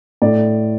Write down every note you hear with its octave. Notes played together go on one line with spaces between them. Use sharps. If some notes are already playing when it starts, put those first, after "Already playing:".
A2 D5